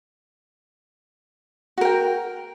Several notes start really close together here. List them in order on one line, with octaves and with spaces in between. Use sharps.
F#4 A#4 G5